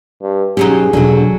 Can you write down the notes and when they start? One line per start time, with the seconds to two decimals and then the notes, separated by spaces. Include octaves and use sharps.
0.22 G2
0.57 B2 F#3 C#4 D#4 G4 G#4
0.93 E1 D3 F#3 D4